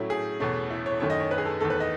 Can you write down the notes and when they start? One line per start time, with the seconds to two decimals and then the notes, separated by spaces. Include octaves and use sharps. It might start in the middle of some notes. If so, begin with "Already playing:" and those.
Already playing: A2 F#3 A3 C#4 E4
0.10 G#4
0.40 E2 B2 A3 C#4
0.70 E4
0.86 C#5
1.00 F#2 D#3 A3 C#5
1.10 D#5
1.20 C#5
1.31 B4
1.38 G#4
1.45 A4
1.60 E2 D#3 A3 A4
1.70 B4
1.80 D#5